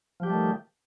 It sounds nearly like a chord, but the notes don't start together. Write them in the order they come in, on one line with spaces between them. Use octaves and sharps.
F3 G4 G3 A3 D#3